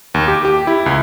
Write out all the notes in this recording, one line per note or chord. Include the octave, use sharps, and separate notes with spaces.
D#2
G4
G4
E4
C#2